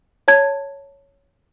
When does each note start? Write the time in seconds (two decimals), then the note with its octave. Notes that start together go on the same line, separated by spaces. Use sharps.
0.28 C#5 A5 G#6